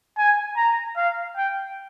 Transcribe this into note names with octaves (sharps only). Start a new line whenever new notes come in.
G#5
A#5
F5
G5